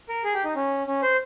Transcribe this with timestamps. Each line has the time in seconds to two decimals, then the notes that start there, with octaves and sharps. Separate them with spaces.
0.09 A#4
0.24 G#4
0.34 G4
0.44 D#4
0.55 C#4
0.87 C#4
1.03 C5